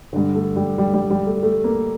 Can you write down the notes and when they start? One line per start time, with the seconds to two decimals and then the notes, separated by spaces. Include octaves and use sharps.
0.13 G2 D3
0.35 A3
0.56 G3
0.78 G3
0.94 G3
1.10 G3
1.27 A3
1.43 A3
1.64 A#3